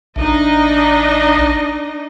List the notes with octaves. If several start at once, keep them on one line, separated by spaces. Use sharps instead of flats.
A1 D4 D#4 D#5